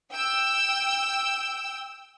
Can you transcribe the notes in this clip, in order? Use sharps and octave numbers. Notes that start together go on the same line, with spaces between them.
G5 E6